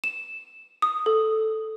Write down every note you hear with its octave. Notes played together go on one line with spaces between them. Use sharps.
E7
D#6
A4